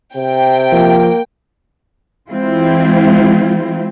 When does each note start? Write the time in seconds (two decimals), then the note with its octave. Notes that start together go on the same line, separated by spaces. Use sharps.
0.15 C3 G5
0.72 F3 A#3
2.29 E3 G#3 C4 E4 F4